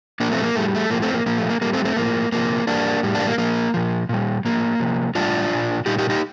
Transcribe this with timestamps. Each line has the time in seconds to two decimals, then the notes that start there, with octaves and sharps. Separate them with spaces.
0.20 A#2 F3 A#3 D4
0.32 A3 C4
0.43 A#3
0.55 A2 G3 A3
0.75 A3
0.90 A2 F3 A#3
1.02 A3 C4
1.14 A#3
1.26 A#2 F3 A#3
1.38 A3
1.50 A#3
1.61 A2 G3 A#3
1.73 A3 C4
1.85 A3 C4
1.96 A2 F3 A#3
2.32 C3 F3 A#3
2.67 A#2 G3 A#3 D4
3.03 A2 G3
3.15 A#3 D4
3.27 A#3
3.38 A#2 F3 A#3
3.74 A#2 F3
4.09 A#2 G3
4.45 A2 F3 A#3
4.80 C3 F3
5.15 A2 G3 D4 F4
5.51 G3
5.54 A#2
5.86 A#2 G3 D#4 G4
5.98 D#4 G4
6.10 D#4 G4